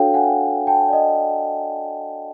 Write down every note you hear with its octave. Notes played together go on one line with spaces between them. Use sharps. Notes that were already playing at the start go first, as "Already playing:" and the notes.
Already playing: D4 F#4 A4 C#5 F5 G5
F#5 G#5
G5 A5
D5
D#5